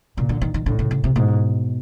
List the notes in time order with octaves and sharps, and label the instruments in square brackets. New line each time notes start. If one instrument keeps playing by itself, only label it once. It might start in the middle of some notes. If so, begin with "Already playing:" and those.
[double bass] A#2 [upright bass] C#3
[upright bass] D3
D#3
D#3
[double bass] A2 [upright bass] D3
[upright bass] C#3
C#3
C3
[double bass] G#2 [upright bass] B2